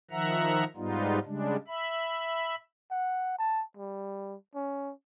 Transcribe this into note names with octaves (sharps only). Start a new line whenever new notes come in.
D#3 F3 E5 F#5 A#5
G#2 G3 B3 D#4 F4
C#3 G3 G#3 D4
E5 B5
F#5
A5
G3
C#4